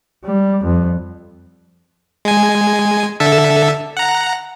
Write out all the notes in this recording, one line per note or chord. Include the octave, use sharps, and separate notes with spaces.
G3
F2
G#3 G#5
D3 A4 E5
F#5 A#5